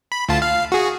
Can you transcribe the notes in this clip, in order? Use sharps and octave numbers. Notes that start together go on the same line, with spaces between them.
B5
D2 F4 A5
F5
F#4 G#4